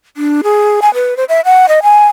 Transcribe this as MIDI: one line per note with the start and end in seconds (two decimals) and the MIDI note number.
0.17 0.41 62
0.44 0.80 68
0.82 0.93 80
0.94 1.17 71
1.17 1.24 72
1.29 1.41 76
1.45 1.68 78
1.69 1.80 75
1.83 2.07 80